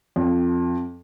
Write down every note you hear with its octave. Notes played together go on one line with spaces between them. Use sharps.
F2